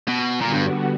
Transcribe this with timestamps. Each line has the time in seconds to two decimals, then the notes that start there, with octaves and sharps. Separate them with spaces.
0.08 B2
0.41 A#2 D3 G3 B3 F#4
0.53 G2